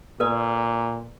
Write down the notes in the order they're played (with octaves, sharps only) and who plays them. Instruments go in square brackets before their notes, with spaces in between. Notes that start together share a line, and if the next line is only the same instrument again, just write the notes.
[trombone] A#2 [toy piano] A4 B4 D5